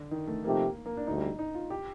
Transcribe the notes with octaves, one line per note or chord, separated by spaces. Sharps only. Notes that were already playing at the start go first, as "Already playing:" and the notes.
Already playing: D3
D#3
A3
C3 F3 A3 A#3 D#4 G4
A#3
D4
D2 D3 G3 D#4
D#4
F4
G4